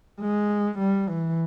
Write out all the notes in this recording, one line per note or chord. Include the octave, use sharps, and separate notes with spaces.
G#3
G3
E3